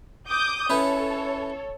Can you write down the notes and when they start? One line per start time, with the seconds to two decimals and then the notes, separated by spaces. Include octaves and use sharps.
0.28 D6 D#6 G6
0.69 C#4 E4 A4 B4 C#5